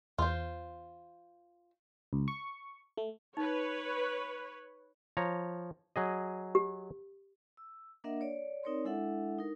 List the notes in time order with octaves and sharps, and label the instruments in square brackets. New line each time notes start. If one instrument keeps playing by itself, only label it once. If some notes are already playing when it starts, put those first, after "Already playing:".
[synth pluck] E2 [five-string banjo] F4 C5
[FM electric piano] C#2
C#6
A3
[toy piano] D#4 [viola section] B4 C#5
[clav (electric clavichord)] F3 C#5 A#5
F#3 G#4 D#5
[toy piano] G4
[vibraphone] E6
A#3 D4 A#4 D#5 E5 F#5
C#5 D5
C4 D#4 A#4 C#5 D5 C6
G#3 D4 E4 A4 E5 F#5
D#4 A#4